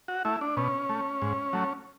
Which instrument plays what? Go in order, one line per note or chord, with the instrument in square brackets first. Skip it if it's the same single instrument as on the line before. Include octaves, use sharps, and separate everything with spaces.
[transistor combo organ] F#4
A3 E4
D4
B2 C#4
A3
G#2
F#3 A3